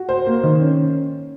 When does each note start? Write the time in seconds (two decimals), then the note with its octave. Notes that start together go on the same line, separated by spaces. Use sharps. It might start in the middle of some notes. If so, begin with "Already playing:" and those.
Already playing: F#4
0.09 C5
0.26 A#3
0.43 D#3
0.60 C#4